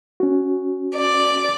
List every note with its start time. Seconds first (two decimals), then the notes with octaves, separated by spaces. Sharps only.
0.20 C#4 F#4
0.95 D5